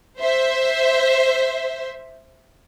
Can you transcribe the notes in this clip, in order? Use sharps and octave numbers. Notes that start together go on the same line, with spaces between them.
C5 E5